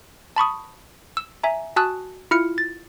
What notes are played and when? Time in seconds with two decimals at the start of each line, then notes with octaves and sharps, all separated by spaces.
0.36 A5 B5 C#6 D#6
1.17 E6
1.43 E5 G#5 A#5
1.76 F#4 G#5 A5 D#6 E6 F#6
2.31 E4 F4 F6 C#7
2.58 A6